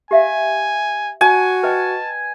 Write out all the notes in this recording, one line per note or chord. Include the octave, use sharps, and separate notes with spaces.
G4 E5 F5 G#5
F#4 D5 G#5 A5
B4 D#5 G5 A5